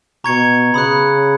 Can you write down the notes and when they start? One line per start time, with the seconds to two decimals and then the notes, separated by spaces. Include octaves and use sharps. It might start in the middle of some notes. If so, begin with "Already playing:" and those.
0.24 B2 A#5 C#6 G#6 C#7
0.74 C#3 B5 D#6 F#6 C#7